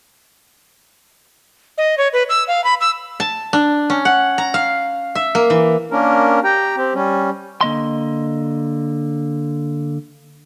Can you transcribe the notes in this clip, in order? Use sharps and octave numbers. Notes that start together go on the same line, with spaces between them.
D#5
C#5
B4
E6
F5
B5
E6
A5
D4
C#4
F#5
A#5
F5
E5
A#3
E3
A#3 C#4 D4 A#4
G4 G5 A#5
C4 G4
G3 C#4
D3 A#3 D#5 C6